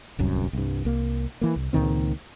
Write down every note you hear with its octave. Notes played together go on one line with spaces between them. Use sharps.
D1 C2 F#2
C2 G2
C2 A#3
E3 A#3
C2
C#2 A#2 D#3 C4